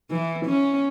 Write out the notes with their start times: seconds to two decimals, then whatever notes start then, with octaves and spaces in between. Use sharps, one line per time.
0.11 E3
0.46 C#4